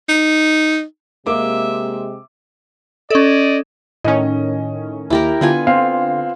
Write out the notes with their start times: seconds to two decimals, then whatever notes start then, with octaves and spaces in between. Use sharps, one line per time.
0.09 D#4
1.27 C3 G#3 A#3 G4 E5 D6
3.10 C#4 A4 D5 D#5
4.04 A2 D#3 C#4 D#5
5.10 D#2 E4 G4 A#4
5.41 D3 B3 F4 G#5
5.67 C4 F5